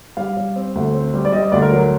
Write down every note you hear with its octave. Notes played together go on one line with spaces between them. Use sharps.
G3 F5
G3
C4
D2
C4
G3
D5
G3 D#5
D#5
D2 D5
A#4
F#3